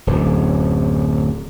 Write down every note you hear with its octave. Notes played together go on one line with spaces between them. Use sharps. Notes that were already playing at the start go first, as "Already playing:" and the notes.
D1 F#2